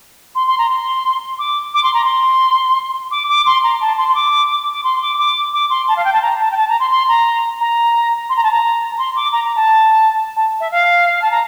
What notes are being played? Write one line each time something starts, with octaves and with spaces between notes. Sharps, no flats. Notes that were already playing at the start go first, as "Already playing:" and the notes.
C6
C6
A#5
C6
D6
D6
C6
A#5
C6
D6
D6
C6
A#5
A5
C6
C6
D6
D6
C6
D6
D6
D6
C6
A5
F5
G5
A5
A#5
A5
G5
A5
A#5
C6
C6
A#5
A#5
C6
A#5
A5
A#5
A#5
C6
D6
A#5
A#5
A5
A5
E5
F5
A5
A#5